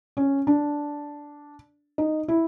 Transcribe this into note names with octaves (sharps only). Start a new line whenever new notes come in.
C#4
D4
D#4
E4